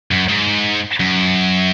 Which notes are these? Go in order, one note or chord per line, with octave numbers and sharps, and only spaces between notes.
F#2
G#2
F#2